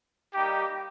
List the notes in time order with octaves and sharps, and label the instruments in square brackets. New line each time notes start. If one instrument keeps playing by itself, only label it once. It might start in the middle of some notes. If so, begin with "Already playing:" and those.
[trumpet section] G3 A#3 D#4 G4